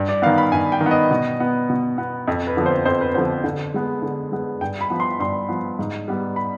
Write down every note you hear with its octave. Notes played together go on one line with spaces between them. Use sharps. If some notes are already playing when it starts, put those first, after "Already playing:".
Already playing: G2
D5
D#3 B3 F5
B5
G2 G#5
G5
D#3
B3 D#5
B2
B3
B2
B3
F2
B4
D3 F3 B3
C5
F2 C5
B4
D3 F3 B3 C5
D3
G#3 B3
D3
G#3 B3
G2 G5
B5
F3 B3
C6
G2 C6
F3 B3
G#2
G3 B3
B5